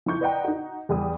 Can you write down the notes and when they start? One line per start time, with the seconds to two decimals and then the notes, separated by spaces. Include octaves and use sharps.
0.06 F3 D#4 E4 C#6 G6
0.21 B4 D5 D#5 F#5 G5 A#5
0.44 D#4 F#4
0.89 E2 G3 D#6